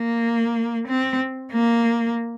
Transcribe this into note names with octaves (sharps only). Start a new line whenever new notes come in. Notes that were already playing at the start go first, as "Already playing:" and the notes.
Already playing: A#3
C4
A#3